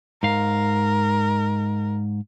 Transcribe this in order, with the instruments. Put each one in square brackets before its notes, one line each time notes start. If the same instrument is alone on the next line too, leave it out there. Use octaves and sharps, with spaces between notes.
[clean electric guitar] G#2 F5 [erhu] A#4